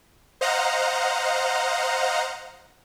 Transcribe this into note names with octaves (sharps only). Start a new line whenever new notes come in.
C5 D#5 F5 F#5 A#5